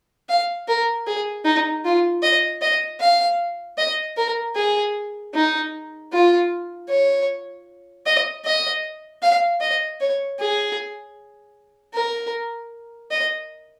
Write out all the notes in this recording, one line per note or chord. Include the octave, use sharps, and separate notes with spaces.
F5
A#4
G#4
D#4
F4
D#5
D#5
F5
D#5
A#4
G#4
D#4
F4
C#5
D#5
D#5
F5
D#5
C#5
G#4
A#4
D#5